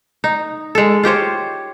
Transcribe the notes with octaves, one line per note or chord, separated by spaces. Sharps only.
D#4
G#3 A4
F4 G4 C5 C#5